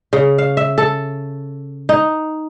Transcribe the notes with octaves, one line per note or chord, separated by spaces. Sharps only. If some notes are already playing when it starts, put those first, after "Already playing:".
C#3
F5
E5
A4
D#4